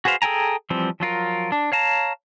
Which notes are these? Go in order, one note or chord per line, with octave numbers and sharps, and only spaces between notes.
F#4 G#4 B4 C5 F5
G#4 A4 G5 G#5 A#5
E3 F3 G3 C4
F3 F#3 F4 A#4
D4
C#5 F5 A5 A#5